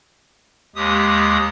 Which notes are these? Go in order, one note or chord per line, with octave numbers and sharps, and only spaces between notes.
D#2 G#3 G4 D#6